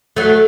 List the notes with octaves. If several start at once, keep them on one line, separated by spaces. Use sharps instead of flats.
F#3 A3